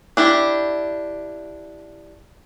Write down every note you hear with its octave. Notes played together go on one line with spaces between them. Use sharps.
D4 E4 G4